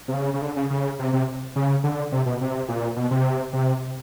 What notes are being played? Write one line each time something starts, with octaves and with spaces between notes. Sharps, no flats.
C3
C#3
C#3
D3
C#3
C#3
C3
C3
C#3
D3
C3
B2
C3
A#2
B2
C3
C3